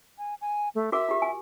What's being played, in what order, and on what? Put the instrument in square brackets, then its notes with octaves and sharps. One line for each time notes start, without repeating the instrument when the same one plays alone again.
[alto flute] G#5
G#5
A3
[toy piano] F#4 A#4 D6 [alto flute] E5
[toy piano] F4 G4
G#5